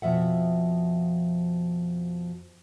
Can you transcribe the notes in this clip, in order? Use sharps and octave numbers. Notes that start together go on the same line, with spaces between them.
F2 B2 F3 E5 F#5